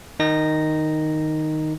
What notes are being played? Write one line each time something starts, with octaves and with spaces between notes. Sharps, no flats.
D#3 D#4 A#6